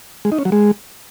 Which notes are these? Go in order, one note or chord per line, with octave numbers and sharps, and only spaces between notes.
G#3
D#4
C#4
F#3
G#3